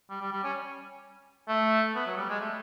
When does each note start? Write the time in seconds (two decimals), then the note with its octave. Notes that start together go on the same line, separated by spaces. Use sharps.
0.10 G3
0.21 G3
0.32 G3
0.44 C#4
1.48 A3
1.95 B3
2.06 F#3
2.17 G3
2.29 G#3
2.40 A3